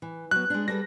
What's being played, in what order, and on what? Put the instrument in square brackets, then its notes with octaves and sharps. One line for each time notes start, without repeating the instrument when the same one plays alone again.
[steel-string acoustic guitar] E3
[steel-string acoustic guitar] F#3 B3 [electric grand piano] F#6
[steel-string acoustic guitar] G#3 D4
[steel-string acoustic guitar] G3 A4 B4 [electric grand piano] A#6